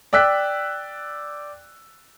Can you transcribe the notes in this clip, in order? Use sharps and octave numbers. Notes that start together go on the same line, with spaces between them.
D5 G5 E6 F#6 B6